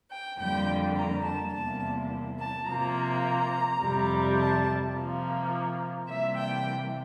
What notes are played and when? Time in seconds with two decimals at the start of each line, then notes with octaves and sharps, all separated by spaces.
0.11 G5
0.39 F2 D3 G3 A#3 G5
0.96 A#5
1.25 A5
1.53 E2 C3 G3 A#3 A5
2.39 A5
2.67 C3 F3 A#3 A#5
3.81 F2 C3 G3
4.38 A5
4.94 C3 F3 A#3
6.09 C3 E3 G3 A#3 E5
6.37 G5